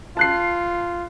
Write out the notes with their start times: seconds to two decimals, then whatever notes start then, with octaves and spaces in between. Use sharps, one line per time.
0.17 F4 A5 F#6 C7